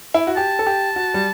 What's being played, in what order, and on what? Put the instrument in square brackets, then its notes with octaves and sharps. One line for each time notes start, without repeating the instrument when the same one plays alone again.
[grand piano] E4
F#4
[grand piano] G4 [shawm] A5
[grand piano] A4
G4
F#4
G3